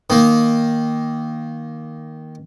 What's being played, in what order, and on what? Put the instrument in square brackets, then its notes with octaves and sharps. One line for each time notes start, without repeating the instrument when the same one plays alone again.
[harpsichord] D#3 A#3